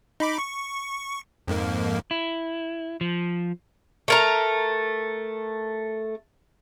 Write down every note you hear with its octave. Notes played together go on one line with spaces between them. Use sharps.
D#4 B5 D6
C#6
F2 G#2 A#3
E4
F3
A3 A#4 A#5